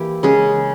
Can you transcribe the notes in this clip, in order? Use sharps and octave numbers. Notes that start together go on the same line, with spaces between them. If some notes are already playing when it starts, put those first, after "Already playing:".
Already playing: E3 A#3 E4 G4
C#3 G#3 C#4 G#4